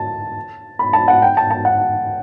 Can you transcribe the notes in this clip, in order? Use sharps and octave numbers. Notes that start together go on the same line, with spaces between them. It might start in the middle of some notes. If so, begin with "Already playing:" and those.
Already playing: A5
B5
A5
F#5
G5
A5
A5
F#5